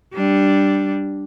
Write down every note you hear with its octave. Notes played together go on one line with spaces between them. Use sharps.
G3 D4